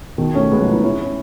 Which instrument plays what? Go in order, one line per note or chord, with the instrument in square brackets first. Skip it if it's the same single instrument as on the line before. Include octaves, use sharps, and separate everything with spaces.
[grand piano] B2 D#3
A3 C#4
G#3 B3
F#3 A3
B3 D#4
C#4 E4
C#4